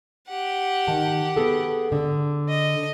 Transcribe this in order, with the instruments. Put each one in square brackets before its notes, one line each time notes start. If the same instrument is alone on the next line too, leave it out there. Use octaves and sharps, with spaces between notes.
[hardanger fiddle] G4 F#5
[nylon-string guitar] D#3 A5
B3 G#4 A4
D3
[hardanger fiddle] D#5